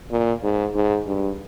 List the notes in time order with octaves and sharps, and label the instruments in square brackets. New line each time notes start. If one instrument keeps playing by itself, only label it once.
[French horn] A#2
G#2
G#2
G2